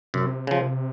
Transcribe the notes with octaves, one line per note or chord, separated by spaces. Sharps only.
F#2 C3
C#3 F3